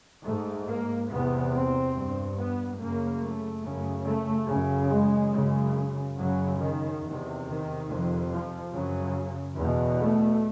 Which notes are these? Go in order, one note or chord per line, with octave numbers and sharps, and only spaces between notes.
G#2 A3
A#3
E2 C3 B3
C4
G2
B3
F#2 C#3 A#3
A3
F#2 C#3
A3
F#2 C#3
G#3
F#2 C#3
F#2 C#3 F#3
D#3
E2 C3
D#3
F2 C3
F3
F#2 C#3 F#3
E2 B2
A3